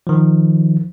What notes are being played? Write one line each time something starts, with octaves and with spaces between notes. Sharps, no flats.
D#3 F3